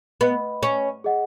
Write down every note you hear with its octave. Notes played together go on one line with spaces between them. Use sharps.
B3 B4 D#5 B5
C#4
G#4 D#5 F#5